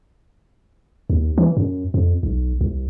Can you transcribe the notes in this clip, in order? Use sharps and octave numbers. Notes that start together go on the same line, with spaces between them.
D#2
E3
F#2
F2
B1
C2